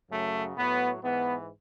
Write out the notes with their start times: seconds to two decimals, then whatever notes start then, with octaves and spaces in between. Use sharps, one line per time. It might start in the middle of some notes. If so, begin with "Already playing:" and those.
0.11 F#2 C#3 F#3 A3
0.57 A2 F#3 B3
1.03 G#2 E3 B3